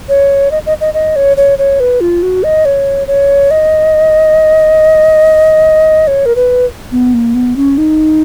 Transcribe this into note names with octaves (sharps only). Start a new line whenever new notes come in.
C#5
D#5
D#5
D#5
D#5
C#5
C#5
C#5
B4
F4
F#4
D#5
C#5
C#5
D#5
C#5
A#4
B4
B3
A#3
B3
C#4
D#4